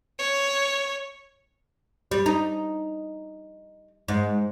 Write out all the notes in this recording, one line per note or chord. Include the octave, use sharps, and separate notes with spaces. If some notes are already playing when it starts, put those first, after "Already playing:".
C#5
G3
D#4
G#2